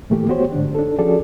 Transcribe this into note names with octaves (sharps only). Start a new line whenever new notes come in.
A2 D#3 E3 A3 A#3 G4
B3 F#4 G4 C5 C#5
G#2 D3 D4
D4 D#4 A4
F3 C#4 F#4 G#4 A4 D5